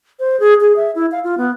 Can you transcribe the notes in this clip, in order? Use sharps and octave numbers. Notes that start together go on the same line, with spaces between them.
C5
G#4
G#4
E5
E4
F5
F4
B3